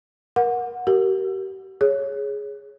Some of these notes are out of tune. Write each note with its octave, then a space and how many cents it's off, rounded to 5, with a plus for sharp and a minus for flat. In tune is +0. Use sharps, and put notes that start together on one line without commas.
A#4 +25 F#5 -20
G4 -35 A#4 +0
G#4 +0 C#5 +0